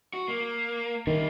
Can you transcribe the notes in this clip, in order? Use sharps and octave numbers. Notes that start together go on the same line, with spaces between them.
F#4
A#3
D#3 G3 A#3